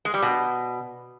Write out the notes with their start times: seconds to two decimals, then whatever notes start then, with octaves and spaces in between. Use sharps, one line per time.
0.05 G#3
0.14 G3
0.22 B2